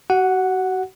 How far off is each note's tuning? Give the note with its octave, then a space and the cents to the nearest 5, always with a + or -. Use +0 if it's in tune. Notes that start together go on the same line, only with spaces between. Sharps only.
F#4 +35 F#5 +0